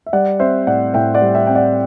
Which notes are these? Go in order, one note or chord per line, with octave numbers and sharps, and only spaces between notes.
E5
G3 D5 F#5
C4 C5 E5
A2 D5 F#5
A2 E5 G5
D5 F#5
G3
E5 G5
C4 G5
D5 F#5